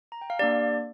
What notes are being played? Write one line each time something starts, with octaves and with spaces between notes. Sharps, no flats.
A#5
G5
F5
A#3 D4 G4 D5